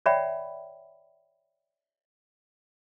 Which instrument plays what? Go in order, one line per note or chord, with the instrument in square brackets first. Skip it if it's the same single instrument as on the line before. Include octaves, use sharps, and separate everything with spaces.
[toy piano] C#5 D5 E5 F#5 G5 B5